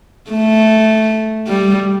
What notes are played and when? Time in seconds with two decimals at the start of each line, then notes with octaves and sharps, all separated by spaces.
0.31 A3
1.47 G3